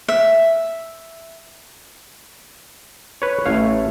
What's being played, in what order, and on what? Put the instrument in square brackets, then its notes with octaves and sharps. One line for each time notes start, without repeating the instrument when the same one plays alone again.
[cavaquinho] E5
[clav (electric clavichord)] B4 C#5
[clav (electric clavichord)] A1 C#5 F5 [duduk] A3